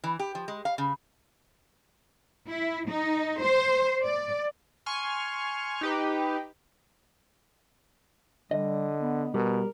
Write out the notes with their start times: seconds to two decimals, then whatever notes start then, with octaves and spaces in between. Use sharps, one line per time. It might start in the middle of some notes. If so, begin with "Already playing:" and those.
0.04 E3
0.19 G4
0.35 F3
0.48 G#3
0.65 F5
0.78 C#3
2.49 E4
2.89 D#4
3.42 C5
4.03 D5
4.86 G#5 C6 C#6 F6
5.81 D#4 G4 B4
8.51 D3 G3 D#5
9.00 B3
9.34 B2 G3 A#4